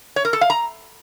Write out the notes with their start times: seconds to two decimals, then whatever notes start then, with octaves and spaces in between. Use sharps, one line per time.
0.16 C#5
0.25 A#4
0.33 A4
0.41 F5
0.50 A#5